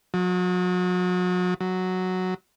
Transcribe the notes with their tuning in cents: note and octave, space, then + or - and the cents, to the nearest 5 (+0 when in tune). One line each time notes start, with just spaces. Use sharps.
F#3 -35
F#3 +0